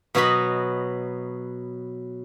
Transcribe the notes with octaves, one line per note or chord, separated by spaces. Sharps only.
B2 F#3 B3 F#4 D#5 B5